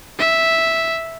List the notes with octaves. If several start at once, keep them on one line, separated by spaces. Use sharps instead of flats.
E5